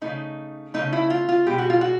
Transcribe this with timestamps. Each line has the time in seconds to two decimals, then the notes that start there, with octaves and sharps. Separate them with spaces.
0.02 C#3 F3 A3 D#4
0.74 C#3 F3 A3 D#4
0.93 E4
1.10 F4
1.29 F4
1.46 B2 G#3 G4
1.58 F#4
1.70 F4
1.81 F#4